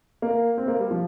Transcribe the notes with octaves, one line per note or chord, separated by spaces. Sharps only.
A#3
C4
A#3
G3
F3